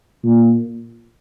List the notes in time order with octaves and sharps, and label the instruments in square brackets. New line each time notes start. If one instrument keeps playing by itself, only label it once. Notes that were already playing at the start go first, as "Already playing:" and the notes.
[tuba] A#2